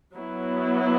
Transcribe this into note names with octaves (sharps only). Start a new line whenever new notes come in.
F#3 B3 E4